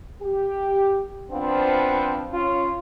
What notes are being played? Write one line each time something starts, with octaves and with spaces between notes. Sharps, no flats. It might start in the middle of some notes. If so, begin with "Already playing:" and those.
G4
F3 B3 C4 D4 F4
C#4 F4